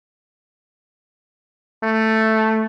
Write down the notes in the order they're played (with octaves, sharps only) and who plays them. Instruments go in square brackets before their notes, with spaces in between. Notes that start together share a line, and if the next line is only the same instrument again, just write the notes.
[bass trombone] A3